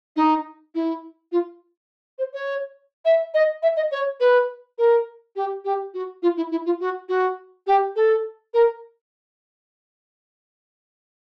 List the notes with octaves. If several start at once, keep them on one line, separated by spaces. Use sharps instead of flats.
D#4
E4
F4
C5
C#5
E5
D#5
E5
D#5
C#5
B4
A#4
G4
G4
F#4
F4
E4
E4
F4
F#4
F#4
G4
A4
A#4